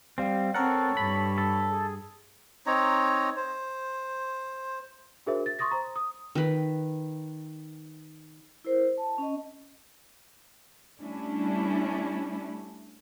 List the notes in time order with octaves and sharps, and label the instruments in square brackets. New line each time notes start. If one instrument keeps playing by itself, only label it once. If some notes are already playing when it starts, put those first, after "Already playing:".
[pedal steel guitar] G3 C4 [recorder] F5
[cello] C4 [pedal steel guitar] A4 [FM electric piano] A#4 F#5 [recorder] C#5
[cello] G2 [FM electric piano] B5
[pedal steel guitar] A4
[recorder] G#4
[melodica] C4 D#4 C#5 A#5
C5
[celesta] D4 F#4 G#4 A#4 C5 E5
A6
C6 C#6 D#6 A6 A#6
C5 A#5
D#6
[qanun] D#3 B4
[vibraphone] E4 A#4 C5
A5
C#4 D#5
[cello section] G3 A3 C#4 D4 E4